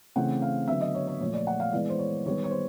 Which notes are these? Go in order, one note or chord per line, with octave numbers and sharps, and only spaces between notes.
C#3 E3 A3 C4 F#5
F5
D3 F#3 B3 E5
D#5
C#5
C#5
A#2 F3 A3 C#5
D5
F#5
F5
E3 G#3 B3 D5
C5
C#5
D#3 G3 B3 C#5
C#5
C5